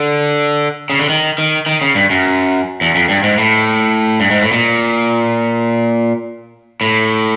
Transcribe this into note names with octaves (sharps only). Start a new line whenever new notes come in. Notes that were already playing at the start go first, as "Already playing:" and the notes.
Already playing: D3
C#3
D3
D#3
D#3
D#3
C#3
G2
F#2
E2
F2
G2
G#2
A2
G2
G#2
A2
A#2
A2